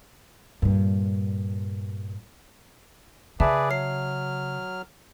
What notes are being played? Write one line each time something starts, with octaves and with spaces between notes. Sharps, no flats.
G2 A#2
C#3 G#4 B4 D5 E5 A5
F#3 C#5 F6 C7